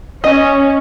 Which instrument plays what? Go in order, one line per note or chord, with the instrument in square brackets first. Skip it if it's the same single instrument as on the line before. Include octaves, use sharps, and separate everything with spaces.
[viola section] C#4 [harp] D#5